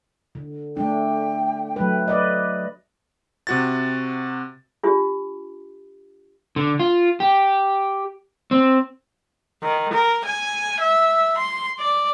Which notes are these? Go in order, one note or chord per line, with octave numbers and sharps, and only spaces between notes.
D3
A3 D4 G5
F#3 A3 B4
B4 D5 D#5
C3 F#4 A6
D4 F4 G4
D3
F4
G4
C4
D#3
A#4
G#5
E5
C6
D5